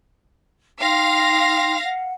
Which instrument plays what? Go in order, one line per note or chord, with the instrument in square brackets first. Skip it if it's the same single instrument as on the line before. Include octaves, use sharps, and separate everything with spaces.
[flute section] D#4 G5 C6 [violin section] F5 A#6
[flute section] F#5